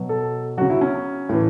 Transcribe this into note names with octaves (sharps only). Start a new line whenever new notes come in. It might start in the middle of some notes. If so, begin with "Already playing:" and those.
Already playing: B2 F#3
A4
C#3 F#3 F#4
E4
C#4
A2 E3